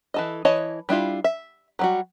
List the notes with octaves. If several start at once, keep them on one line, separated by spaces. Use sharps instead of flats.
E3 A4 D#5
E3 C#5 D#5 A5
G3 D4 E4 F4
E5
F#3 G3 F#4